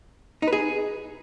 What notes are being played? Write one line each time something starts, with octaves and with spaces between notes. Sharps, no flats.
D#4
B4
G#4